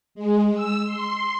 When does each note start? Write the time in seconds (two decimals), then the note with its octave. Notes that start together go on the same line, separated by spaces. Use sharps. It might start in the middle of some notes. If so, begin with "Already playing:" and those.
0.15 G#3
0.54 E6
0.85 C6